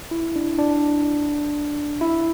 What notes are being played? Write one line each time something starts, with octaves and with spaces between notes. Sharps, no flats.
E4
D4
D4
E4